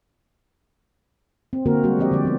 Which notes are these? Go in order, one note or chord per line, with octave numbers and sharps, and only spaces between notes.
C4
D3 A#3 C4 F#4 A#4
G3 G#3 F#4
F3 C4 G4 D#5
D3 F3 D5
F3 B3